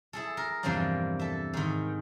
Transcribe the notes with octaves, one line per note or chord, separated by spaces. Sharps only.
E4 G#4 A4
A#4
E2 G2 C3 F3 A#3 D5
A4 E5
G#2 D#3